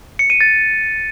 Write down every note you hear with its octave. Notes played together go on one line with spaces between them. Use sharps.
C#7
D#7
A6